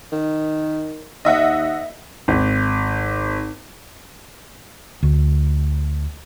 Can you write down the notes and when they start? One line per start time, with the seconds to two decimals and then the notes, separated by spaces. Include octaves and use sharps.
0.12 D#3
1.25 D#2 D#5 E5 F#5
2.28 G#1
5.03 D2